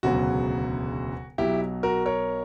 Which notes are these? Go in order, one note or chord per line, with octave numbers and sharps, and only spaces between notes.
E1 D2 C#3 F#3 B3 F#4
B1 B2 F#3 E4 G4
F#4 A#4
A#4 C#5